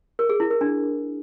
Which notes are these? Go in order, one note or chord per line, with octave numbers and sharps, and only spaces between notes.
A#4
G#4
E4
A#4
D4